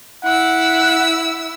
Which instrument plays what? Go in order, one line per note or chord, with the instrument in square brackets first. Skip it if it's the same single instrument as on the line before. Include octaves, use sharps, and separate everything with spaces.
[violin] E4 E6 [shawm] F#5